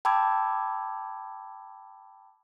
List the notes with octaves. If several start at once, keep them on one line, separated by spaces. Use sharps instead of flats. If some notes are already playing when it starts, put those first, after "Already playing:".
G5 A5 B5 D6 E6 G#6